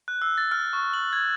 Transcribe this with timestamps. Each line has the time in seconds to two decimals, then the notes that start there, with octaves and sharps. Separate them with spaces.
0.08 F#6
0.22 E6
0.38 A6
0.51 F6
0.73 C#6
0.94 F#7
1.13 G#6